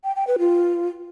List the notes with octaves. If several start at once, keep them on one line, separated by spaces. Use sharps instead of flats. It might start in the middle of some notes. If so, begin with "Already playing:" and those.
G5
G5
B4
F4